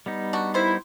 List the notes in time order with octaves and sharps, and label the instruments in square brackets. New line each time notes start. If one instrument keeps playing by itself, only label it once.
[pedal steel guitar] G3 B3 D#4
[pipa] D4 F#4
[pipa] D#3 C5 [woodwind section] E4